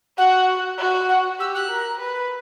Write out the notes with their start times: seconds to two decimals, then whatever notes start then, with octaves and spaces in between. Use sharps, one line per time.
0.17 F#4 F#5
0.79 F#4
1.09 F#5
1.39 G4 E6
1.54 F#6
1.70 A#4
1.99 B4